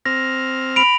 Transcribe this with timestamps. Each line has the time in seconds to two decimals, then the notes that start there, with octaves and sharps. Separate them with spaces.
0.06 C4 F6 A#6
0.76 B5 D7 F7